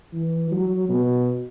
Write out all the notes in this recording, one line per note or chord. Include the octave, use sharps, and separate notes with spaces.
E3
F#3
B2